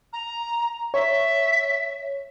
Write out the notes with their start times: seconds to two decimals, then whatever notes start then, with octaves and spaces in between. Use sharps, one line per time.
0.13 A#5
0.94 C#5 E5